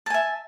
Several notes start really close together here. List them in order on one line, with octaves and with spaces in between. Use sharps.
A5 G#5 E5